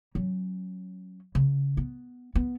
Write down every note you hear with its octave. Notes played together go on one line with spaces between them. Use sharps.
F#3 C#4
C#3
B3
B3